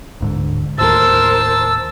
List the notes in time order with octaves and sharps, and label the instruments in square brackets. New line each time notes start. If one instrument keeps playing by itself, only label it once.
[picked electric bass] D1 G#2 D3
[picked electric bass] D#2 A2 [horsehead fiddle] A#4 C5 [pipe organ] A5 [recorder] E6